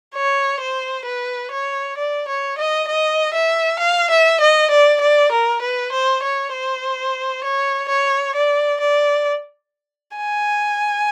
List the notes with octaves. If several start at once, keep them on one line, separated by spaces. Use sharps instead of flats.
C#5
C5
B4
C#5
D5
C#5
D#5
D#5
E5
F5
E5
D#5
D5
D5
A#4
B4
C5
C#5
C5
C#5
C#5
D5
D5
G#5